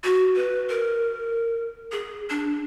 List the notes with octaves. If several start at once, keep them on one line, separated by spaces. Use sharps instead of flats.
F#4
B4
A#4
G#4
D4